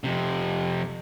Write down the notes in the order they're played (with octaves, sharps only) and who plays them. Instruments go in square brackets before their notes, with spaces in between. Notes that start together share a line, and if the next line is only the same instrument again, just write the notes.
[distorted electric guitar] F2 C3